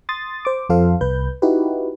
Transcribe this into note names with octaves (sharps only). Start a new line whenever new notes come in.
C6 D#6 A6
C5 D6
F2 F3 F4 A4 C5 F5
C2 B4 G6
D#4 E4 F#4 G4 B4